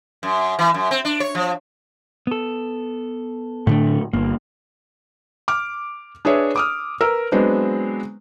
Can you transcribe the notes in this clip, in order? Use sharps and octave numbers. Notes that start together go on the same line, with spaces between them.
F#2
E3
F#2
C4
D4
C#5
F3
B3 A4
A2 D3 A3 D4
G1 A#3
D6 F6 D7
D4 G#4 B4 C#5 E5
D6 D#6 F6
A#4 B4 E6
F#3 G#3 B3 C4 D4